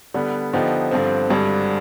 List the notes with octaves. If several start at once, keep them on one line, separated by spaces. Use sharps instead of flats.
D3 G3 B3
D3 F3 B3 D#4 G4
G2 D3 F3 C4
G#1 G2 D3 G3